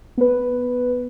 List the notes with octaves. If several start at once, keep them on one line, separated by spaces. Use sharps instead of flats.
B3 B4